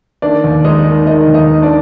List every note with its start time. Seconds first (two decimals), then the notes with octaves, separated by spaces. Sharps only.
0.22 D#3 D4 D5
0.44 D#2
0.64 G#3 D#4 D#5
0.86 D#3
1.06 D#3 D#4 D#5
1.28 D#2
1.34 D#4 D#5
1.49 D#3
1.62 D4 D5